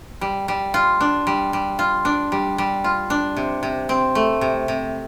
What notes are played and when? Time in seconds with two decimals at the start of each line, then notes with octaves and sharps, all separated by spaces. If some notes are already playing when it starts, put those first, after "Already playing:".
0.21 G3
0.48 G3
0.74 F4
1.00 D4
1.27 G3
1.53 G3
1.79 F4
2.05 D4
2.32 G3
2.58 G3
2.84 F4
3.10 D4
3.36 C3
3.63 C3
3.89 C4
4.15 A3
4.41 C3
4.68 C3